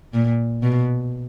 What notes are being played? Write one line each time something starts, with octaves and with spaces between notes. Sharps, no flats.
A#2
B2